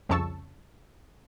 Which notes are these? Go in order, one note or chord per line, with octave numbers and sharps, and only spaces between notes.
C2 F2 C#3 A5 C#6 E6